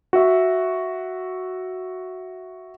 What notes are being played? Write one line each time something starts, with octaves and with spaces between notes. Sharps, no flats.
F#4 E5